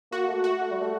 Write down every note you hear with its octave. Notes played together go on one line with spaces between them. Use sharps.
A#3 F#4
A3
F#4
A3
G3
A3